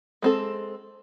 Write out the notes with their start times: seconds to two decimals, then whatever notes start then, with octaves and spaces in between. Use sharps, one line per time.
0.22 G#3 C4 A4